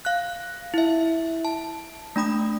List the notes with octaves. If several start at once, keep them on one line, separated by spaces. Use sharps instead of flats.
F5 F#6
E4 E5
A5
A3 D4 B5 D#6